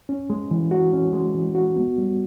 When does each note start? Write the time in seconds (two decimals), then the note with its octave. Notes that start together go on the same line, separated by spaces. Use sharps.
0.09 C#4
0.30 G#3
0.51 E3
0.71 F#4
0.93 C#4
1.13 G#3
1.34 E3
1.55 F#4
1.76 B3
1.98 G3